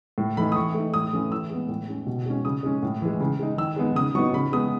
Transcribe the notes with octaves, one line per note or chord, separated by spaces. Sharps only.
A2
E3 A3 D#4 B5
D#6
E3 C#6
A3 D#4
A2 D#6
E3 A3 C#4
E3 E6
G#3 B3
A2
G#3 C#4
B2
G#3 C#4
C#3 D#6
G#3 C#4
A2
E3 G#3
C#3
G#3 D#4
D#3 E6
G#3 B3 D#4
C#3 D#6
F#3 B3 D#4 C#6
C#3 B5
G#3 B3 D#6